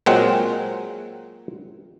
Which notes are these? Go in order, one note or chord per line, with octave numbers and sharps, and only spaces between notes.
A#2 F#3 G#3 C4 F#5